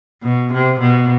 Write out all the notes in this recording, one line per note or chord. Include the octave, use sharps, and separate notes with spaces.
B2
C3
B2